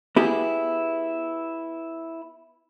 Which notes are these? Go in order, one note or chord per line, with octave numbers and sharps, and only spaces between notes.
B3 E4 G4 G#4